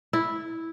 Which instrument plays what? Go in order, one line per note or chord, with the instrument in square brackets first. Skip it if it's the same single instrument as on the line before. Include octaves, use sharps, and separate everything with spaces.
[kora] E4